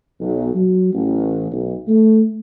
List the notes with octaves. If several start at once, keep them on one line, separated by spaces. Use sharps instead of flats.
B1
F#3
A1
B1
A3